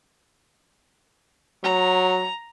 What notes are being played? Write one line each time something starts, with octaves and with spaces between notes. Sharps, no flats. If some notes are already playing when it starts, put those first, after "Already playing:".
F#3 A#5